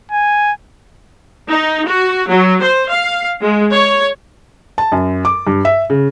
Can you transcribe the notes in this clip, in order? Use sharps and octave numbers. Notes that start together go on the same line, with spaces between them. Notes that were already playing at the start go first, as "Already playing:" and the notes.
G#5
D#4
F#4
F#3
C5
F5
G#3
C#5
A5
F#2
D6
G2
E5
C#3